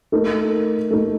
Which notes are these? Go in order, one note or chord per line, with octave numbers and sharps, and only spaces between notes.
A3 D#4 A#4
A3 D#4 A#4